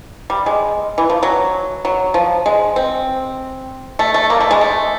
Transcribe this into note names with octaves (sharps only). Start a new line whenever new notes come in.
G3
G#3
E3
F3
F#3
F#3
F3
G#3
C4
A3
A3
A#3
A3
G#3
A3